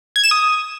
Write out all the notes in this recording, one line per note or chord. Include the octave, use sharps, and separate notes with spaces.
G#6
E7
D#6